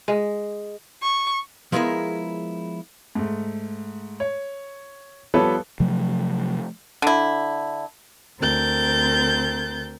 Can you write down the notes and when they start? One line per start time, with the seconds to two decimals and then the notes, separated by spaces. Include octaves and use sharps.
0.08 G#3
1.02 C#6
1.72 F3 G#3 B3 E4 G#4 A#4
3.15 G#2 A3
4.20 C#5
5.34 F3 G3 B3 A4 B4 C#5
5.80 C3 F3 F#3 A3
7.02 D3 E4
8.40 D2 C4 A#4 G6 A6